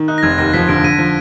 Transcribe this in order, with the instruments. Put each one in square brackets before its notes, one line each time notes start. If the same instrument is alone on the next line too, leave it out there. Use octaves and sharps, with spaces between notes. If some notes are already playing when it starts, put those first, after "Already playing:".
Already playing: [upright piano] D#3
[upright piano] D#4 [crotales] F#6
[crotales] A#6
[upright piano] F1 [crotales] G#6
[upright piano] D#2 [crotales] A#6
[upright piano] F3 [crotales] B6
[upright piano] D3 [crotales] D7
[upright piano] D3 [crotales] D#7
[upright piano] F3